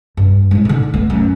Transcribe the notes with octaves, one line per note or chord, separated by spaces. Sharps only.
G2
A2 G#3
D3 D#4
A3 B3
F#2